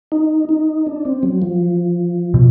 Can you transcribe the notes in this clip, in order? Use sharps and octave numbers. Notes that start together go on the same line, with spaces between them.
D#4
D#4
D4
C4
F#3
F3
B2